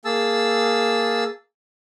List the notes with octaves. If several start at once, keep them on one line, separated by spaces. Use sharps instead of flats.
A#3 G#4 A5 E6